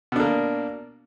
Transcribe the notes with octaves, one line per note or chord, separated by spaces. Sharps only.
B2 A#3 D4